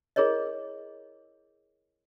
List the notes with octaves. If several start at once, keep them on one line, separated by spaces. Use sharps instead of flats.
E4 G#4 A#4 C#5 D#5